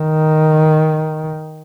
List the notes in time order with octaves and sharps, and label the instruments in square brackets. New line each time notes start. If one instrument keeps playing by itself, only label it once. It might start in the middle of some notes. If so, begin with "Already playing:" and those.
Already playing: [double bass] D#3